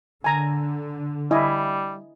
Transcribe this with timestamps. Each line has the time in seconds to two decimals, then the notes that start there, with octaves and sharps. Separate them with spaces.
0.24 D3 G#5 A#5
1.31 G3 E4 D#5 G#5